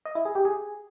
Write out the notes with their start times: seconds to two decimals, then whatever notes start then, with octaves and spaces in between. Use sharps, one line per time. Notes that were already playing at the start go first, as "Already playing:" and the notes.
0.06 D#5
0.15 E4
0.25 G#4
0.35 G4
0.45 G#4